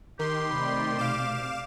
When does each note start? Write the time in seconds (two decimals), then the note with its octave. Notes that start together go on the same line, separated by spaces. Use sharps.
0.19 D#3 G4 A#4 C6
0.51 C3 A3 D5 B5
0.98 B2 F5 D6 E7